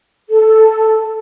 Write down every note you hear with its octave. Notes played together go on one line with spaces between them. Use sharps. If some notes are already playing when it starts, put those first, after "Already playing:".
A4